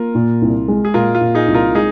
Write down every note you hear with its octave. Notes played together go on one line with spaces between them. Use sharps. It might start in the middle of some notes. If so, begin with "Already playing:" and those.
Already playing: A#3 F4 A#4
A#2
C2
G#3
G#4
A#2 F4 A#4
F4
A#2
D#4 G#4
C2
F4 A#4
G#3 D#4 G#4